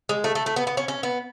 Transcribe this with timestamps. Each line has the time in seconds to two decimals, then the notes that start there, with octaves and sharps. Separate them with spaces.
0.09 G#3
0.24 A3
0.35 A3
0.46 A3
0.56 B3
0.67 B3
0.77 C#4
0.88 C#4
1.03 B3